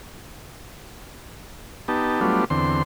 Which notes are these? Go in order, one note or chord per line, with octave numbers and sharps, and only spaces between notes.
B3 D#4 G4 A5
F#3 G3 A3 B3 D4 F4
E2 D3 C4 C6